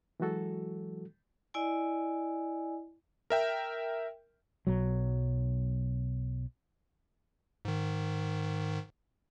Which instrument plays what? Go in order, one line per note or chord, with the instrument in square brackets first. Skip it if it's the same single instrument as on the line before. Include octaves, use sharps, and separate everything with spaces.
[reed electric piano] E3 F#3 G#3 F#4 A4
[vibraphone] E4 D5 D#5 G#5
[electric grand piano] A#4 E5 G5
[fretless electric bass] B1 F#3
[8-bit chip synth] G#2 D#3